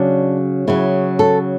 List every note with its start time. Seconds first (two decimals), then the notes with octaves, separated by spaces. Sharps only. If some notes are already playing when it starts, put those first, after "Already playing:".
Already playing: C#3 F#3 D4
0.67 C#3 F#3 E4
1.19 A4